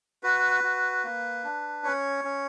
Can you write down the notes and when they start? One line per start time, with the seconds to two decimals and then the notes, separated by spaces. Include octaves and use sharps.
0.23 F#4 B4
0.64 F#4
1.04 A#3
1.44 D4
1.84 C#4 C#5
2.25 C#4